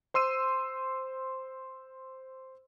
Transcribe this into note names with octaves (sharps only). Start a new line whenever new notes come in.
C5 C6 E6 D#7